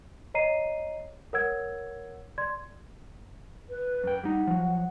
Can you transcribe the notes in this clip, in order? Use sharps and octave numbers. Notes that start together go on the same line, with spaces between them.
C#5 D#5 A#5 C7 D#7
A#4 C#5 F#5 E6 G#6
D5 C6 G#6
B4
F#2 G5
G3 D#4 F#5
F3 F#3